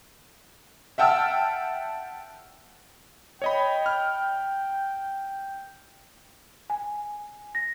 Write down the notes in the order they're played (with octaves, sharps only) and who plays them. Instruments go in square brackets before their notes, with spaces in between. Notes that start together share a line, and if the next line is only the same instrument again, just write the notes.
[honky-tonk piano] E5 F#5 G5 A5 E6 F6
[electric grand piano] C#5 D#5 B5 [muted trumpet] G5
[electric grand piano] F6
[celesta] G#5
A#6